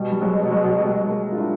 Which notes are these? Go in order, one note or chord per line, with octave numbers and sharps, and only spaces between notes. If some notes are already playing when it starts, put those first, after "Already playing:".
Already playing: B2 G3
G3
F#3 G#3
F#3 G#3
G3 A3
G#3 A#3
F4
D4 E4